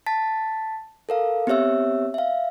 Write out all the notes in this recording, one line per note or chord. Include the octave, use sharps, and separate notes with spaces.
A5 A6 B6
A4 A#4 F5
B3 C4 G4 C#5 E5 E6
E5 F5